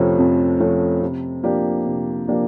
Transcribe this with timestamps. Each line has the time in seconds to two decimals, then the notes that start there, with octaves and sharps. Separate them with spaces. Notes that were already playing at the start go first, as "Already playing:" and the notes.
Already playing: F2 C3 F3 A3 C#4
0.19 F2
0.60 C3 F3 A3 C#4
1.01 C3
1.43 F3 A#3 D4 G4
1.86 C3
2.28 F3 A#3 D4 G4